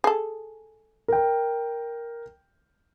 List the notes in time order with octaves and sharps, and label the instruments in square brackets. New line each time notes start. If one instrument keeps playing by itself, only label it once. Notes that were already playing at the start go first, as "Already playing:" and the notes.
[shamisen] G#4 A4
[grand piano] A#4 G5